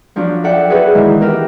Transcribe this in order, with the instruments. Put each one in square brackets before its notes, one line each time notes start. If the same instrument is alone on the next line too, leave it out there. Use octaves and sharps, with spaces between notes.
[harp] F3 F#3 D4
A4 D5 E5 F#5 G5
F#4 G#4 A4 B4 E5
D#3 E3 F#3 G#3 E4
E4 G4 A#4 B4 E5